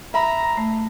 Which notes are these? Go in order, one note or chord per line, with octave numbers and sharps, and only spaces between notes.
E5 A#5 B5
A3